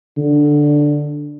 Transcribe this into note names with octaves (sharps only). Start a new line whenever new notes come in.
D3